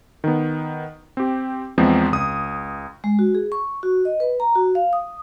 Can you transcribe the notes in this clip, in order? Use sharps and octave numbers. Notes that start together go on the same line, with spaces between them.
D#3 B3
C4 G4
E2 F3 G#3 B3 C4
C#2 D#6
G#3
F#4
G#4
C#6
F#4
D#5
B4
A#5
F#4
F5
D#6